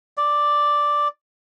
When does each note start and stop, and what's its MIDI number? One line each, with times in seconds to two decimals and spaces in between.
0.17 1.08 74